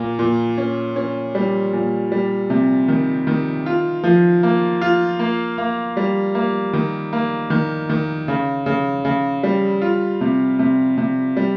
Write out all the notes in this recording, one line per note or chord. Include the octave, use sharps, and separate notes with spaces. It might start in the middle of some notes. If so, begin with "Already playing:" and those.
Already playing: A#2 A#3
A#2
C#4
C#4
G3
A#2
G3
C3
D#3
D#3
F4
F3
A#3
F4
A#3
A#3
G3
A#3
D#3
A#3
D#3
D#3
C#3
C#3
C#3
G3
F4
C3
C3
C3
G3